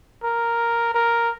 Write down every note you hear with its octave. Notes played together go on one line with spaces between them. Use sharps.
A#4
A#4